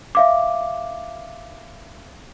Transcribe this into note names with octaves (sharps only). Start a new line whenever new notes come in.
E5 F5 D6